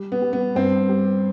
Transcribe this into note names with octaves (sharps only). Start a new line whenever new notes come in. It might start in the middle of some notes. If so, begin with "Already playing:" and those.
Already playing: G3
B3
G3
B3
G2 C4
G3